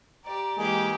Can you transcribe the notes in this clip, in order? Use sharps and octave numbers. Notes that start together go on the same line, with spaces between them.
G4 D5 A#5
E3 G#3 A#3 G4 G#4 G5